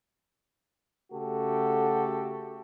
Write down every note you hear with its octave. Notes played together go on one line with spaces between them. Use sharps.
C#3 A3 F#4 G4 A4